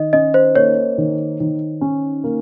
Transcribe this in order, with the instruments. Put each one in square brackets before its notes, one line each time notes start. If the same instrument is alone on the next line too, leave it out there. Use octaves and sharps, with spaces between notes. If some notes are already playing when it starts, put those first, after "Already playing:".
Already playing: [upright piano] D#3 [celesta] D#5
[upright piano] C#4 [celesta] D#5
[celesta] C5
[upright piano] A#3 [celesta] C#5
[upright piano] D#3
D#3
C#4
A#3